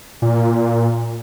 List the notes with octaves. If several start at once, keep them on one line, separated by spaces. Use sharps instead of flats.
A#2